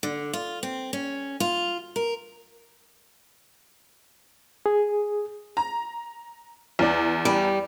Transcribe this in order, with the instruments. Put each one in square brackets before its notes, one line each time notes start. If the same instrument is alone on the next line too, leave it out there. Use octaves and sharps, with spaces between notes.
[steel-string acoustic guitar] D3
F4
C4
C#4
F4
A#4
[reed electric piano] G#4
[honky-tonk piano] A#5
E2 D5
[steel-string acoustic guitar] G3